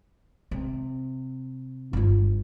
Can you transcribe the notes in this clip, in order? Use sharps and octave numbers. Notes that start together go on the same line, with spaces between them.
C3
G1 F4